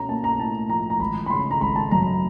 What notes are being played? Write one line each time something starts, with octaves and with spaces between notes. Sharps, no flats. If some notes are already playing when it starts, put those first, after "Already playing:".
Already playing: B2 C#4 A#5
A#3 A5
A#5
A2 A5
F3 A#5
A#5
G#1 B5
B5
C#3 C6
A#5
G#1 B5
A5
F#2 A#5